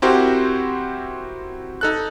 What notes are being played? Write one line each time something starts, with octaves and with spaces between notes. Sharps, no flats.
C4 E4 F#4 G4 A#4 C5
D#4 A4 F#6